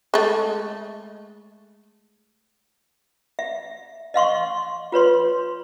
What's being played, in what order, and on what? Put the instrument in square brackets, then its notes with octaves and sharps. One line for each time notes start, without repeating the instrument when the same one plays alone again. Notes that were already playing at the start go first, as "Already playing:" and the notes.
[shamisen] G#3 A3
[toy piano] E5
D#5 F5 C6 C#6
F4 B4 C#5 C6